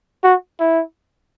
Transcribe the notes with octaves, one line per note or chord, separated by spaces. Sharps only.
F#4
E4